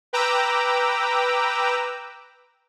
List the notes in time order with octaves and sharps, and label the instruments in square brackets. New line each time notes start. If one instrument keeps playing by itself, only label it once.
[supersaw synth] B4 G5 A#5 D6 E6